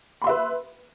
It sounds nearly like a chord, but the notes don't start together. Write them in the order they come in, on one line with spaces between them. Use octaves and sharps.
B5 C6 E5 B4